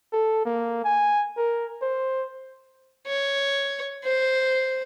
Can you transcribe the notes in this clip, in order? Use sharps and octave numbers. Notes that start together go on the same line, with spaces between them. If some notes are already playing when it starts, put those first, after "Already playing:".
A4
A#3
G#5
A#4
C5
C#5
C5